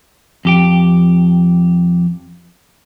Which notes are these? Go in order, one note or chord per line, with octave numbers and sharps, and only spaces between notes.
F2 G4 G5